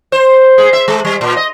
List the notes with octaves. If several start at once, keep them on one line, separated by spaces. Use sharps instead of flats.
C5
G#4
E5
G#3
G3
A#2
D#5